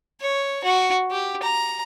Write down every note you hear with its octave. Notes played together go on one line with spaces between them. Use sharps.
C#5
F#4
G4
A#5